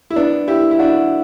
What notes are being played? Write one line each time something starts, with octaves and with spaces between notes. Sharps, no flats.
E4
B3 D4
E4 G4
E4
D4 F#4